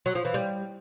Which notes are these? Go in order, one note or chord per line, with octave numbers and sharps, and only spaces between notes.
F#3
F3
E3
G3